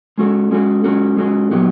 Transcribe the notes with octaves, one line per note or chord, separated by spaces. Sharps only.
G#3 C#4 F#4 A4
G#3 C#4 F#4 A4
G#3 C#4 F#4 A4
G#3 C#4 F#4 A4
A#2 F#3 B3 D#4 G4